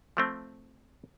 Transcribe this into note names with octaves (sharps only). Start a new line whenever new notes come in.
F3 A3 C4